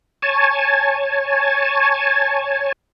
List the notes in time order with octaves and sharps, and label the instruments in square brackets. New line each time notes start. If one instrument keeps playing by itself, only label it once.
[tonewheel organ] C#5 G#5 A5